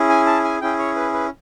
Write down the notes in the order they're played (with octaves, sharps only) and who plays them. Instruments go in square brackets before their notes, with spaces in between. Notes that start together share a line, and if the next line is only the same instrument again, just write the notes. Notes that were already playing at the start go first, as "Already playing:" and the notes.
Already playing: [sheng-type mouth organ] C#4 E4 G#4
G#5
A5
G#5
C#4 E4 G#4 G5
C#5
B4
B4